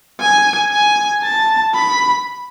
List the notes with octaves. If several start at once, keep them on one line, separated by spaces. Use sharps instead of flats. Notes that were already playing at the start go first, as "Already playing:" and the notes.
G#5
G#5
A5
B5